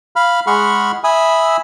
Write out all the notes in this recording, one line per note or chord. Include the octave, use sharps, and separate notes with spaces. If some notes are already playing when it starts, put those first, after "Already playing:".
F5 B5 F6
G#3 G#4 F#5 B5 C#6 F6
E5 G#5 B5 D#6 E6